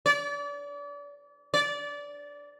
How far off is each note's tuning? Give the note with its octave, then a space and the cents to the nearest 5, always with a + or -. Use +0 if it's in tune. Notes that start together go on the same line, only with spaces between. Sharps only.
D5 -35
D5 -20